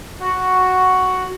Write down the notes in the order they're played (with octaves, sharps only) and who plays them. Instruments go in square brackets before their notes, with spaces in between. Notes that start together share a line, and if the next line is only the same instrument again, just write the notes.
[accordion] F#4 F#5